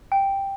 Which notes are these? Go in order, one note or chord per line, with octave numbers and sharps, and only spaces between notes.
G5